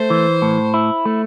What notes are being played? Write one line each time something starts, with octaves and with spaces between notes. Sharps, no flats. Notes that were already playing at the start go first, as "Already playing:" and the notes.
Already playing: A3 C5
E3
A2
E4
A3